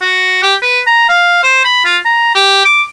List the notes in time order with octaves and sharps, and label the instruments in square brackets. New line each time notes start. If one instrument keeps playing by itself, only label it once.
[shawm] F#4
G4
B4
A#5
F5
C5
B5
F4
A#5
G4
D6